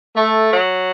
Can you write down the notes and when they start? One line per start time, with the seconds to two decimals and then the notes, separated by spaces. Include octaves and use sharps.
0.15 A3
0.52 F#3